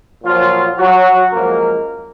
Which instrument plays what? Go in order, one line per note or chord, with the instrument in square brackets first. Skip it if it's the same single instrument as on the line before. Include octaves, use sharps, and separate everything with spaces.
[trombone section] A#2 F3 F#3 F4
F#3 F#4
F#2 F3 G#3 A#3 A#4